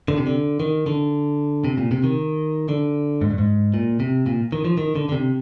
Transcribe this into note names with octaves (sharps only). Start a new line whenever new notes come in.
D3
C3
D3
D#3
D3
C3
A#2
C3
D#3
D3
G#2
G2
G#2
A#2
C3
A#2
D#3
F3
D#3
D3
D3
C3